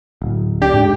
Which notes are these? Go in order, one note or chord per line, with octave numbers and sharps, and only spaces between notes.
D1
D4 G4
G#2